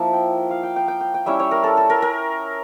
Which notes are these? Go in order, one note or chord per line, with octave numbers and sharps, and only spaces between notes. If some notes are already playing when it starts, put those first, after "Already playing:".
Already playing: F3 A#3 E4 A5
G5
F5
G5
G5
G5
G5
G5
G3 C#4 E4 E5
C#5
A#4
A4
A4
A#4
A#4